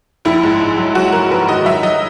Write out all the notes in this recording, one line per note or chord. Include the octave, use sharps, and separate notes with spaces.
A#1 E4
G#2
A#1
F#3
F#3 F#4
F#3 A#4
A#1 B4
D#3 D#5
F#3 E5
F#3 D#5